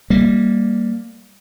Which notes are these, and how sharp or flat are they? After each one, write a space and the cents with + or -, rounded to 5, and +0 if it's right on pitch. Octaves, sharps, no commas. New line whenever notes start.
G3 +0 A#3 +0